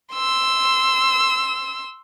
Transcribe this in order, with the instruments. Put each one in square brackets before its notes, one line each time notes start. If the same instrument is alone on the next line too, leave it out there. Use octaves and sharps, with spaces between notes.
[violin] C6 E6